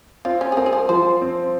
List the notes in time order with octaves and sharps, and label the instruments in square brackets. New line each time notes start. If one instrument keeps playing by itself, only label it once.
[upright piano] C4 [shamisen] F4
[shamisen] C#4
G#4
[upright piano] C4 [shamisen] A#4
[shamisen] G#4
A#4
[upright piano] F3 [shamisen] C5
[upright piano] C4